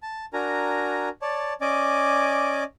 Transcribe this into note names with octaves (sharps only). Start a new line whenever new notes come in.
A5
D4 F#4 A#4 G#5 A#5
C#5 D5 A5
C#4 D5 D#5 G#5 D6